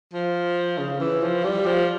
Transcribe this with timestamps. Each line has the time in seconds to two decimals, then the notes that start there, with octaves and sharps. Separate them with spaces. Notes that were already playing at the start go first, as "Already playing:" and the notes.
0.14 F3
0.78 C#3
1.00 E3
1.23 F3
1.44 G3
1.66 F3